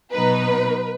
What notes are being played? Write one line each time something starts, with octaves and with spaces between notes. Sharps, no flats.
B2 F#3 B3 D#4 B4